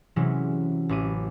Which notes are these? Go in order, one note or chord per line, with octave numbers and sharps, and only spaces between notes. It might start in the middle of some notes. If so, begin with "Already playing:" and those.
C3 E3 F#3 G#3 C#4 E4
A1 E4 D6 D#7